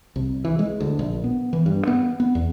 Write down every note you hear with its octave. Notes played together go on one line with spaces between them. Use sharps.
C2
E3
G#3
D2
A#1
B3
E3
G2
B3
B3
E2